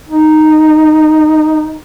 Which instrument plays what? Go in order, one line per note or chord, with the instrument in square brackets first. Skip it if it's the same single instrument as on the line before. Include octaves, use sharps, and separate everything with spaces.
[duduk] D#4